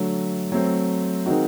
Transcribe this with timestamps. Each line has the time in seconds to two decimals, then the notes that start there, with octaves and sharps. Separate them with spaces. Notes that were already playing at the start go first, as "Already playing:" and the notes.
Already playing: D3 F#3 A3
0.52 F#3 A3 C4
1.26 D#3 G#3 C4 D#4 F#4